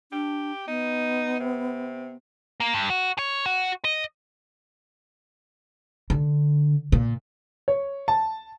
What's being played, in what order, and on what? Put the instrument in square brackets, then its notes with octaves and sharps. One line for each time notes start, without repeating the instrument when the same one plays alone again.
[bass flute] D4 [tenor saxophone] G4
[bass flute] B3 [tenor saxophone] D#4
[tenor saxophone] C3
[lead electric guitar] A#3
G2
F#4
C#5
F#4
D#5
[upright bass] D3
A#2
[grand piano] C#5
A5